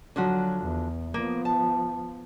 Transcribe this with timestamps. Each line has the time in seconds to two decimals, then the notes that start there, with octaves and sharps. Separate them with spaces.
0.16 D3 F3 F#3 F#4
0.64 E2
1.14 F3 A#3 B3
1.45 A5